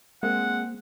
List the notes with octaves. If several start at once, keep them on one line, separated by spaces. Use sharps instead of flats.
G#3 A#3 C4 F#5